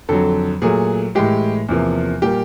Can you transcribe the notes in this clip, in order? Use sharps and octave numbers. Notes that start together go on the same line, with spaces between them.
F2 D3 F#3 A4
A#2 F#3 A3 G#4
A2 E3 G#3 G4
E2 C3 F3 A#3
A#2 G3 A#3 G4